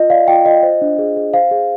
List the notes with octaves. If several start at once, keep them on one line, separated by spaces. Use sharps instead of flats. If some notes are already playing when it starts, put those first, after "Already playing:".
Already playing: F4 D#5
D5 F5
F4 G5
F4 D#5
C5
D4
G#4
G#4
C5 F5
G#4